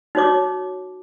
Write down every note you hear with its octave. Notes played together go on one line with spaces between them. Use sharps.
D#4 F#4 C#5 D6